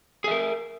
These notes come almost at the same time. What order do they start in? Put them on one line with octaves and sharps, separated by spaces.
G#4 E5 A#4